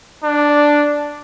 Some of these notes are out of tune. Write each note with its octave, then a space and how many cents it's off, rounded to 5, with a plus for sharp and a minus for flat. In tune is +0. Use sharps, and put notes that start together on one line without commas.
D4 +0